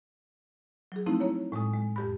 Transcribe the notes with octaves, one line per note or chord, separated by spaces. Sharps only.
F#3 G#4
F3 A3 C4 D#4 E4
A#3 E4 C#5
A2 G#3 G#5 D#6
G#3
F2 G4 B5